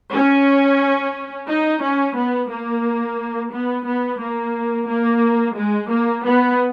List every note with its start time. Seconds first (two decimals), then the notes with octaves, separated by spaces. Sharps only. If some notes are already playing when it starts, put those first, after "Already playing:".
0.13 C#4
1.48 D#4
1.82 C#4
2.17 B3
2.50 A#3
3.52 B3
3.86 B3
4.20 A#3
4.88 A#3
5.56 G#3
5.90 A#3
6.25 B3